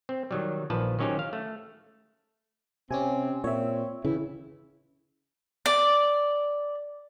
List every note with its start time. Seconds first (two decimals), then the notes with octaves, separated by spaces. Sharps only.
0.09 C4
0.31 D#3 F#3 G3
0.70 A#1 D#3 F3 B4 A5
0.99 D#3 F#3 C#4 D#4 G4 C5
1.19 F5
1.33 A3
2.91 C3 C4 C#4 G4 G#5
3.44 A#2 C4 C#5 E5
4.05 C#3 E3 E4
5.66 D5